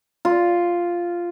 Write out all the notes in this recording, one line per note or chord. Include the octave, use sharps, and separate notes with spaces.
F4